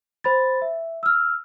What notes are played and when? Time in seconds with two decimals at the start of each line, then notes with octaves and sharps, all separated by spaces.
0.24 C5 B5 A6
0.62 E5
1.03 E6 F6